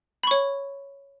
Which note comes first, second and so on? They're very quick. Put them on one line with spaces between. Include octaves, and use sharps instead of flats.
B5 C#6 C#5